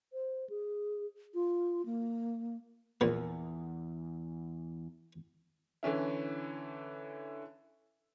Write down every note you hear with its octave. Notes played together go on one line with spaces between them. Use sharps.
C5
G#4
F4
A#3
A#1 E2 A#2
D3 E3 C#4 E4